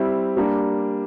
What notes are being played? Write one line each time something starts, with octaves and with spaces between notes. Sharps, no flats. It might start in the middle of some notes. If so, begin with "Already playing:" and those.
Already playing: G3 C4 E4
G3 A#3 D4